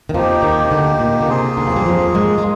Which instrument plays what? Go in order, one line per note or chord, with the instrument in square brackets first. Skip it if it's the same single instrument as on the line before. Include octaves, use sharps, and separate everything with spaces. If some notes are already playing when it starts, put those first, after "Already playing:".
[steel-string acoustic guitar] D#3
[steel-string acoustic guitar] F2 F3 [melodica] A#3 D#4 G4
[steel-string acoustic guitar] D#2 D#3
C3
D2 D3
A#2
D#3
D3
[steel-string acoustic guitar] C3 [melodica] A#3 F4 G#4
[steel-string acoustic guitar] D2 D3
F2 F3
G2 G3
F2 F3
G#2 G#3
G#3